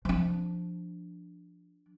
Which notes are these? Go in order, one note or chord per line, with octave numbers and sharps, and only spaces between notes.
F3 D4